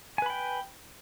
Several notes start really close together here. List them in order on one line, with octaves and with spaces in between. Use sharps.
G#5 B4 B5 G5